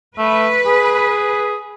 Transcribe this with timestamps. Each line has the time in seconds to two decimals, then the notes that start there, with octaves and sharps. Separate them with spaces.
0.18 A3 B4
0.66 G#4